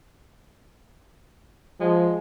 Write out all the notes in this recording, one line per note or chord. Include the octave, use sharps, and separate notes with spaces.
F3 G#3